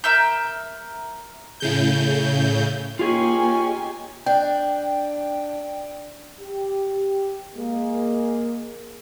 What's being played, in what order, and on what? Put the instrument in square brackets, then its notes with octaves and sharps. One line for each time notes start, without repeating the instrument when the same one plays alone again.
[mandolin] A#4 E5 G6
[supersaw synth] A2 C#3 G6
[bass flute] A#3 [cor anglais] C#4 [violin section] D#4 G4 G#5 [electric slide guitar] F4 G#4
[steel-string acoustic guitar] D4 [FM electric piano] G5
[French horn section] G4
G#3 A#3 G#4